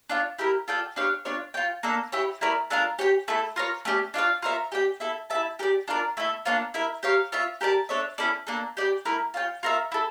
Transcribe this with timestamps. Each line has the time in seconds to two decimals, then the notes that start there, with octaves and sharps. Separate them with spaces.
0.10 D4 F4 C#5
0.38 E4 G4 A#4
0.68 F4 A4 D5 G5
0.96 D4 G4 C#5 F5
1.25 D4 F4 C#5
1.54 F4 C#5 G5
1.83 A#3 D4 A4
2.12 E4 G4 C#5 G5
2.41 A3 E4 A#4 D5
2.70 A3 D4 F4 A#4
2.99 G4 C#5 G5
3.28 A3 E4 A4
3.56 F4 A#4 C#5
3.85 A3 C#4 G4 D5
4.14 D4 F4 C#5 F5
4.42 F4 A#4 C#5 E5
4.72 G4 D5 G5
5.00 E4 A4 E5
5.30 E4 A4 E5 A5
5.59 G4 A#4
5.63 D5
5.88 D4 F4 A#4 D5
6.17 A3 E4 A4 E5
6.45 A#3 D4 F4 C#5
6.74 E4 A#4 E5
7.03 G4 A#4 C#5 F5
7.32 F4 C#5 E5
7.61 G4 A#4 D5 A5
7.89 D4 A4 C#5 E5
8.18 C#4 E4 A4 D5
8.47 A#3 D4 A4
8.77 G4 D5 G5
9.05 A3 E4 A#4
9.34 F4 C#5 G5
9.63 F4 A#4 C#5 E5
9.92 E4 A4